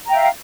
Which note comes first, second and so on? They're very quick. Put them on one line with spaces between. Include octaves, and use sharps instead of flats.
A#5 G5 E5 F5